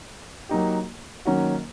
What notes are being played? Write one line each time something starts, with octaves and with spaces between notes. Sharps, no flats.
F#3 A#3 D#4 G4
D#3 F#3 A#3 C#4 F#4